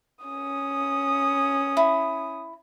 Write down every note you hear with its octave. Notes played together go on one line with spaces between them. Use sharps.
C#4 D#6
E4